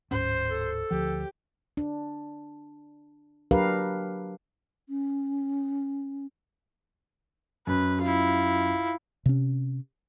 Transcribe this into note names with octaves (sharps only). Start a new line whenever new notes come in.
D1 G#2 C#4 C5
A4
D2 F3 G4
D4
F#3 D4 G4 A#4 B4 F5
C#4
F#2 B4
E4 F4
C3 C#4